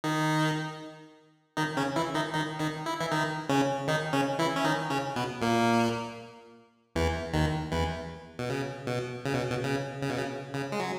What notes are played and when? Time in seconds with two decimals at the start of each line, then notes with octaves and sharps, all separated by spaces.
0.04 D#3 D#4
1.57 D#3 D#4
1.77 C#3 C#4
1.96 E3 E4
2.15 D#3 D#4
2.34 D#3 D#4
2.59 D#3 D#4
2.86 E4
3.00 E3 E4
3.11 D#3 D#4
3.49 C#3 C#4
3.88 D#3 D#4
4.13 C#3 C#4
4.39 E3 E4
4.56 C#4
4.64 D#3 D#4
4.90 C#3 C#4
5.16 B2 B3
5.42 A#2 A#3
6.96 E2 E3
7.34 D#2 D#3
7.71 E2 E3
8.39 B2
8.49 C#3
8.87 B2
9.25 C#3
9.34 B2
9.50 B2
9.64 C#3
10.02 C#3
10.10 B2
10.17 C#3
10.54 C#3
10.72 G#3
10.80 F#3